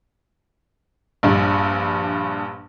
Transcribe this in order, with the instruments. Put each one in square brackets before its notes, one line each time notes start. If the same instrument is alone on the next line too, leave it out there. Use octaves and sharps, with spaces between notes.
[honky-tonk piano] A#1 G2